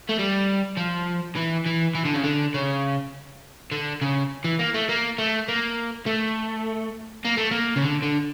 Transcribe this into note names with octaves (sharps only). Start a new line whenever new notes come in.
A3
G3
F3
E3
E3
E3
D3
C#3
D3
C#3
D3
C#3
E3
A#3
A3
A#3
A3
A#3
A3
A#3
A3
A#3
C#3
D3
D3